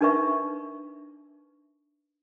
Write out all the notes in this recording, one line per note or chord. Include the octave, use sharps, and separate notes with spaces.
D4 D#4 A#4 B4 E5 C#6